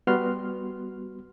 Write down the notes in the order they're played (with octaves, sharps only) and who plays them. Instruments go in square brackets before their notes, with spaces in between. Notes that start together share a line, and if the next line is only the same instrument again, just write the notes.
[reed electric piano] G3 B3 F#4 C6 F6